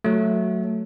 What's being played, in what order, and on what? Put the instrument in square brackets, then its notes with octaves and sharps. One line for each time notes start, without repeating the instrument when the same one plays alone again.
[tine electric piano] F#3 A3